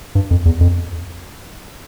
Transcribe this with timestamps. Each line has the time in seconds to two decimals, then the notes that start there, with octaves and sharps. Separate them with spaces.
0.15 G2
0.31 F2
0.45 E2
0.61 F2